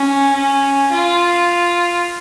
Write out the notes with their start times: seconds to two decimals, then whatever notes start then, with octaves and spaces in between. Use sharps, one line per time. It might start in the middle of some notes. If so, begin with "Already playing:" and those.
Already playing: C#4
0.33 C#4
0.92 F4